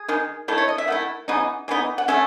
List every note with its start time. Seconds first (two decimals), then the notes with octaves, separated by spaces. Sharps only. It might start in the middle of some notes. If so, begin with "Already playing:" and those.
Already playing: G#4
0.08 D#3 G#3 D#4
0.48 D#3 A3 E4 A4
0.58 C#5
0.68 D#5
0.78 E5
0.88 D#3 A3 E4 F#5
1.28 C#3 E3 B3 D#4
1.68 C#3 E3 B3 D#4
1.98 F#5
2.08 A3 C#4 E5